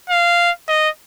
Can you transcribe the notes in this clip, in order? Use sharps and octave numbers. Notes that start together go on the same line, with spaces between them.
F5
D#5